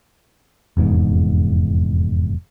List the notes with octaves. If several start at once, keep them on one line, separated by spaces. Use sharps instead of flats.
F1 E2 G#2